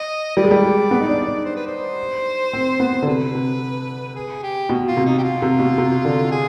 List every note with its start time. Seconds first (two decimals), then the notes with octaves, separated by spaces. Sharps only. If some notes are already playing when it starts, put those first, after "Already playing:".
Already playing: D#5
0.36 G3 D5
0.44 G#3
0.51 G3
0.64 G#3
0.91 B3
1.01 D#4
1.09 D4
1.27 D4
1.45 C5
1.56 B4
1.67 C5
2.53 C4
2.80 B3
3.02 D3
3.07 C3 B4
3.35 C3
4.16 G#4
4.43 G4
4.69 B2
4.88 F4
4.97 C3
5.06 D#4
5.18 G4
5.23 F4
5.42 C3
5.59 B2
5.78 C3
6.05 D3
6.31 G#4